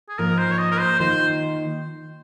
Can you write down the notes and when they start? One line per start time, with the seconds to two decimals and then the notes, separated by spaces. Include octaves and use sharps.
0.09 G#4
0.18 G#2 F3 A#3 A#4
0.38 C5
0.51 C#5
0.58 D#5
0.71 A#4
0.79 C5
0.99 D#3 A#3 F4 C5